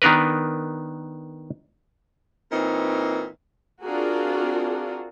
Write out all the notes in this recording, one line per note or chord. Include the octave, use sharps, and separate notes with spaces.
D#3 B3 D4 A#4 B4
A#2 E3 C4 D#4
C4 D4 F4 F#4 G#4 A#4